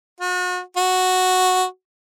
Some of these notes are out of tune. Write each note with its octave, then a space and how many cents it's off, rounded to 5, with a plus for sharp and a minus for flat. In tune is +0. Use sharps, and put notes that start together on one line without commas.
F#4 -40
F#4 -5